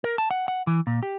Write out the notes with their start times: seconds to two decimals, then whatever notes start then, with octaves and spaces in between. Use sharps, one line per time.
0.04 A#4
0.18 A5
0.31 F#5
0.48 F#5
0.67 E3
0.87 A#2
1.03 G4